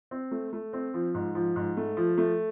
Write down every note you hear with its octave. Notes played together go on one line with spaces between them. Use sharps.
C4
A3
A3
C4
F3
G#2
F3
G#2
A3
F3
A3